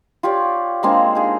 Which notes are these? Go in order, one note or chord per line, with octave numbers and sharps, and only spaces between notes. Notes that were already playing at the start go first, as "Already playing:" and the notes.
F4 G4 C#5 D5
G#3 A#3 C4 D4
D#4 G#4